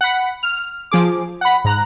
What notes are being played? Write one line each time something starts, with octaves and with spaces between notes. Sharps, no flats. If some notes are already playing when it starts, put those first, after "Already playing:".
F#5 B5
F6
F3 G#4 D6
F#5 B5
G#2 A#5 F#6